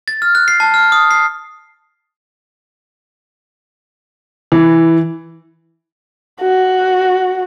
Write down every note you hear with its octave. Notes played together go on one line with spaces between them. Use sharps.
A6
F6
F#6
C7
A5
F6
D#6
C7
E3
F#4